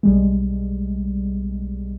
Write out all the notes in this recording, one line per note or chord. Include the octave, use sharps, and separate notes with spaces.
B1 G3 G#3